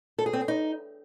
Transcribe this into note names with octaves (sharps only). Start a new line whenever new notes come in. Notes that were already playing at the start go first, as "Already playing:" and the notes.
A4
G#4
C4
G#4
D#4